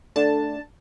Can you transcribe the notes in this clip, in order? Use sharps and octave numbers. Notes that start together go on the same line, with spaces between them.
D3 A3 D4 A5